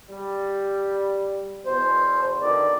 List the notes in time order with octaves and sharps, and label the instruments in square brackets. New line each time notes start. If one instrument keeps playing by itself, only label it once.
[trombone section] G3
[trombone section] E2 B2 [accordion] C5
[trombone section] B2 D3 D#3 [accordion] D5